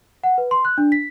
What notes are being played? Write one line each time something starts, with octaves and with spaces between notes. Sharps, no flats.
F#5
B4
C6
F#6
D4
B6